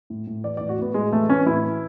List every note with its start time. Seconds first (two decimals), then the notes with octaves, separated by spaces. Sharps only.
0.10 A2
0.27 A2
0.44 E3 D5
0.57 A2 D5
0.69 F#4
0.78 A2 B3
0.94 A2 G#3
1.12 E3 A3
1.29 E3 C#4
1.46 A2 E4
1.64 E3